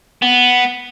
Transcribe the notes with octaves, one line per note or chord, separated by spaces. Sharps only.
B3